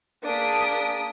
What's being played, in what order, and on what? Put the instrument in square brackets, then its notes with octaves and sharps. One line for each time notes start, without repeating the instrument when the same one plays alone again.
[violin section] A#3 D4 G#4 D#6 B6 D7